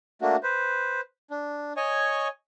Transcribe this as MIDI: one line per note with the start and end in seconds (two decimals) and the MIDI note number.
0.22 0.36 57
0.22 0.36 58
0.22 0.36 62
0.22 0.36 66
0.43 1.01 71
0.43 1.01 72
1.30 1.73 62
1.77 2.28 73
1.77 2.28 75
1.77 2.28 80
1.77 2.28 85